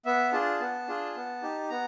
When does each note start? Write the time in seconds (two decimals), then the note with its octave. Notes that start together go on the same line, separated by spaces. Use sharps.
0.05 B3 E5
0.33 D4 F4 G#4 A5
0.60 B3
0.87 D4 F4 G#4
1.16 B3
1.42 D#4 G4
1.70 B3 A#5